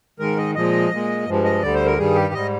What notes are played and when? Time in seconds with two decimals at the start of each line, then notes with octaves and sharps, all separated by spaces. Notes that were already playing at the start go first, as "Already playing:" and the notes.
0.19 G#2 D#3 G#3 A#4
0.37 D#5
0.55 A#2 F3 G#3 D#5
0.91 A#2 G#3
1.27 G2 F3 G#3
1.44 D#5
1.62 D2 D3 G3 D5
1.74 C5
1.86 A#4
1.98 G2 D#3 G3 G#4
2.15 G4
2.34 G#2 G3 D#5